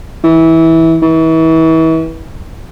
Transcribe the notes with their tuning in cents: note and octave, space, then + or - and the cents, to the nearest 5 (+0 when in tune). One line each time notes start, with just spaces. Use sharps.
E3 -20
E3 -35